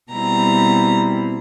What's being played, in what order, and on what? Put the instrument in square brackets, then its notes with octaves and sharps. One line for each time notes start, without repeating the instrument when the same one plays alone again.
[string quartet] B2 G3 C4 E4 A#5